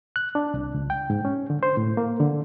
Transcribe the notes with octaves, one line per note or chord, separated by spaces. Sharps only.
F#6
D4
C2
C#2
G5
G#2
C#4
D3
C5
A2
A#3
D3